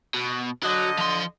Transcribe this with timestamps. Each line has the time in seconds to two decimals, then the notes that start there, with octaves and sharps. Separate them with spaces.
0.14 B2
0.63 D3 F#3 D#5
0.98 F3 C6